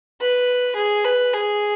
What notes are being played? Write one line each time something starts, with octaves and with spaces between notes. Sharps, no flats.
B4
G#4
B4
G#4